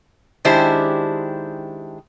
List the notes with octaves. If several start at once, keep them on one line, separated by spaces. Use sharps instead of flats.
D#3 G#3 D4 E4 G4 C5